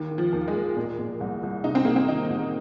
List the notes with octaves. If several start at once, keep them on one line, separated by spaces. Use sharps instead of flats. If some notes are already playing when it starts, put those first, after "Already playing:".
Already playing: D#2 D#3
D#3
F3
D#2
G#3
D#2
A#2
A#2
C2
C2
C3 D#4
C4
C2 A#3
C4
D#3 D#4
C2